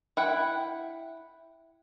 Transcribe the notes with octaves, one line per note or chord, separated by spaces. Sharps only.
E4 F#5 G5